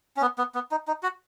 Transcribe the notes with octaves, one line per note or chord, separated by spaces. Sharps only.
C#4
B3
B3
B3
D#4
D#4
F#4